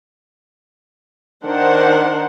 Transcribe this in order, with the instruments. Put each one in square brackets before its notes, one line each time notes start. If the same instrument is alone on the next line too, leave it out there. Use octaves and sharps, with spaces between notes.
[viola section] D#3 D4 A#4 C5 F#5